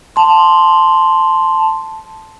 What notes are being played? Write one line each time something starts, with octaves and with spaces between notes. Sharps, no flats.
A5 C6